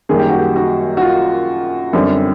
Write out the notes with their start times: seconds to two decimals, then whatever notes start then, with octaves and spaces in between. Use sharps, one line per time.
0.09 F#2 D#3 G3 A#3 G#4
0.19 G4
0.29 F#4
0.38 G4
0.56 F#4
0.97 F#4
1.02 F4
1.93 F#2 D3 G3 C4